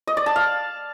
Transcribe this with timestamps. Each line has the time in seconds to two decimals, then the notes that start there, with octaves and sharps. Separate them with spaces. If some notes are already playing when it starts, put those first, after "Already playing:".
0.07 D#5
0.17 D5
0.26 A5
0.36 F5